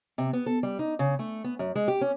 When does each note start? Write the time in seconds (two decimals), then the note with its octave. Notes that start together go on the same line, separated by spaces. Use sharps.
0.18 C3
0.33 B3
0.46 A4
0.63 G3
0.79 D#4
0.99 C#3
1.19 A3
1.44 B3
1.59 F#2
1.75 G#3
1.88 G4
2.01 C#4